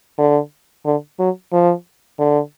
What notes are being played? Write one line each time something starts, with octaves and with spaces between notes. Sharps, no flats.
D3
D3
F#3
F3
D3